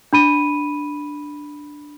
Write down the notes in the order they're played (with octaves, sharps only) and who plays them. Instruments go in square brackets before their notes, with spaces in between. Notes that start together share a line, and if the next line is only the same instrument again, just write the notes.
[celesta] D4 B5 D#7